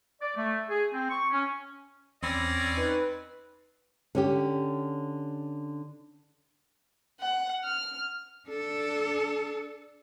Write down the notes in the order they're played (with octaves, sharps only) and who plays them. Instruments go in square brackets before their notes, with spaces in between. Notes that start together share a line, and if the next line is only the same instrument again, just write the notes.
[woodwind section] D5
A3
G#4
C4
C#6
C#4
[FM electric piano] E2 B5 E6 [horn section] C4 C#4 D5 [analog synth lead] A#6
[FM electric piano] D#4 [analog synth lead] B4
[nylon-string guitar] D3 C#4 G4
[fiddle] F#5
F6
[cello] D4 A4